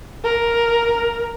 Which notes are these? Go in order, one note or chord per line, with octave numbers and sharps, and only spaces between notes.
A#4